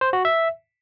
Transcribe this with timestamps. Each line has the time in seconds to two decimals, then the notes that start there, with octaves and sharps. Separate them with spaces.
0.01 C5
0.13 F#4
0.25 E5